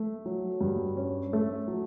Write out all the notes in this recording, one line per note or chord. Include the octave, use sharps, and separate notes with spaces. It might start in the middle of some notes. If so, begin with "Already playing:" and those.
Already playing: A3
F#3
G2
C#4
A3
F#3